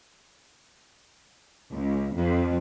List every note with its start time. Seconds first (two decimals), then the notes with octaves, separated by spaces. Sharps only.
1.73 C#2
2.15 F2